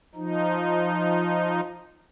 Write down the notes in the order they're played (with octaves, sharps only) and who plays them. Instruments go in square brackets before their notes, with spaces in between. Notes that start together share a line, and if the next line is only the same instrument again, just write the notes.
[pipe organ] F3 D#4